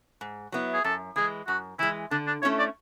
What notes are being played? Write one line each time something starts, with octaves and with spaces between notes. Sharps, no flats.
G#2
F#3 B3 E4
G#4
F#2 A4
E3 G#3 G#4
F#2 F#4
E3 G#3 E4
D3 D4
D4
A3 C#4 E4 C#5
D5